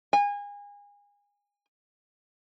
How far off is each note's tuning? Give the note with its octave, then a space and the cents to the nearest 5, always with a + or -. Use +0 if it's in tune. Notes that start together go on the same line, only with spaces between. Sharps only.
G#5 -30